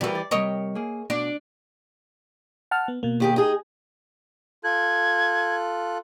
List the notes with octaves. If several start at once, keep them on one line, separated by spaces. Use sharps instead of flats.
E2 E3 G3 F#4 A#4
D5
C3 G3 A#4 C#5 D#5
A#3 G#4
B2 D4
F#5 A5 F6
B3
B2 A#3
D#2 G4 G#4
D#4 G#4
F4 A4 F#6 G#6